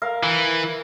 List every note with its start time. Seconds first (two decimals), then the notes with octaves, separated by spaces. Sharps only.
0.02 A#4 F5
0.23 E3